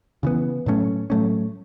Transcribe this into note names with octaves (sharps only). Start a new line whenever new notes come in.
C#3 E3 B3
A2 F#3 A3 C#4
A2 F#3 A3 C#4